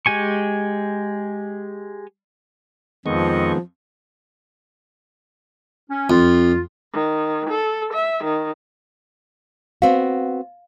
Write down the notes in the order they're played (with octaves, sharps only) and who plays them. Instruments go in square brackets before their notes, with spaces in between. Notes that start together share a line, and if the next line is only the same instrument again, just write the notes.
[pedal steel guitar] G#3 G4 G#5 C#6
[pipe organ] F2 D#5 C#6 [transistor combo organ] D#3 G#3 B3 [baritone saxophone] F3
[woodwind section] C#4
[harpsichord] F2 [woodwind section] F4
[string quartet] D#3
A4
E5
D#3
[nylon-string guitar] B3 C4 F#4 [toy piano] F5